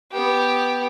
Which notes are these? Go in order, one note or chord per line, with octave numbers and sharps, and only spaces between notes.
B3 G4